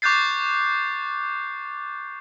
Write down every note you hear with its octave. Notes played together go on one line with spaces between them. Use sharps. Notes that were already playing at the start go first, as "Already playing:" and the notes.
C#6 D6 F#6 G6 A6 C7